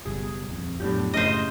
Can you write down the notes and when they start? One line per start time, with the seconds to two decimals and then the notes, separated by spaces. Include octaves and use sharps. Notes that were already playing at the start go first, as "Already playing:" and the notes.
0.05 F#1 B2 G3 G#4
0.49 D#1 F2 C4
0.80 F2 A2 F#3 B3 D4 G4
1.14 F#2 C#3 A3 C5 D#5